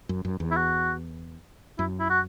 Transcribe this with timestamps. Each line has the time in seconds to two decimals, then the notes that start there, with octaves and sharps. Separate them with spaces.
0.09 F#2
0.25 F#2
0.40 E2
0.51 E4
0.56 F#4
1.78 F#2 E4
1.99 E4
2.10 F#4